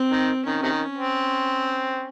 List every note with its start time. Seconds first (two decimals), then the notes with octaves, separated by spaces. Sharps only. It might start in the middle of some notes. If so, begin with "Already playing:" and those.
Already playing: C4
0.11 D#3
0.45 D#3 C#4
0.63 C3 D#3
0.98 C4